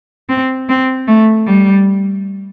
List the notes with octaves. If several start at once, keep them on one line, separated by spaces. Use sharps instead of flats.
C4
C4
A3
G3